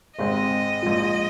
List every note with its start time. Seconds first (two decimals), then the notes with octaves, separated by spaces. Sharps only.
0.19 G#1 G#2 G#3 C4 D#5
0.83 A#1 G#2 F3